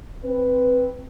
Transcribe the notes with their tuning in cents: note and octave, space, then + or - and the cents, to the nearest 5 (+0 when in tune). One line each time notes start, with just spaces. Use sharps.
C4 +0 B4 +0